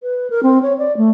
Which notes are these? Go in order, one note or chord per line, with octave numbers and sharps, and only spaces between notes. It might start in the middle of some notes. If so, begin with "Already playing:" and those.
B4
A#4
C4
C#5
D5
A3